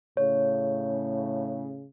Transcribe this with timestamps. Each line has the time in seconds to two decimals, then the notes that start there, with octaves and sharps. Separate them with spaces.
0.17 A2 C#3 C#5